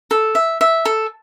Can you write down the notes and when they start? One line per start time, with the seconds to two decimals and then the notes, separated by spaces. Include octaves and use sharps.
0.11 A4
0.35 E5
0.61 E5
0.85 A4